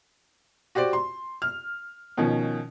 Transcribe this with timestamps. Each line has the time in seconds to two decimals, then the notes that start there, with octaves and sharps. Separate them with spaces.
0.75 F#4 G4 C5 D5
0.93 C6
1.42 F6
2.17 B2 D#3 F3 C#4